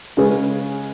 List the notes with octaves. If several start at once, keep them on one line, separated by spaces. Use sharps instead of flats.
C#3 G#3 C#4 G#4 B4